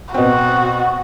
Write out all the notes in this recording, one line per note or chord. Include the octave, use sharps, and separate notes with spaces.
B2 C4 F#4